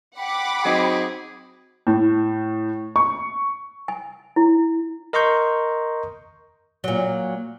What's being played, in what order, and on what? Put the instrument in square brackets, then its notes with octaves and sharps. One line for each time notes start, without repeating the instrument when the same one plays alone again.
[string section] F#5 B5 D6 [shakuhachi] G5
[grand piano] F#3 C4 D#4 [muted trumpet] G#4
[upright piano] A2
C#6
[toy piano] G#5
E4
[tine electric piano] A#4 D#5 A#5 C6 C#6 G6
[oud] A#2 F#3